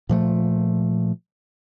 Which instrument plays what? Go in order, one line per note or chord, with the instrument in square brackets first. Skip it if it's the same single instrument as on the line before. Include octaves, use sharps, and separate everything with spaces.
[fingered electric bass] A#2 F3 A3